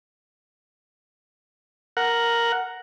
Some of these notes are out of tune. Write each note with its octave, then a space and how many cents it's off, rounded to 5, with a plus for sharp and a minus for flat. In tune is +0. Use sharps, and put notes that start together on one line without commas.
A#4 +0 F#5 +0